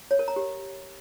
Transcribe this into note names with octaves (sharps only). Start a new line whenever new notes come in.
C#5
A#4
A#5
G4